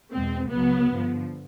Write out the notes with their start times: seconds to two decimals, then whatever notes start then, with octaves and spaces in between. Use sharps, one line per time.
0.12 E2 B2 G#3 C4
0.50 C#2 C#3 F#3 B3
0.87 G2 D3 F3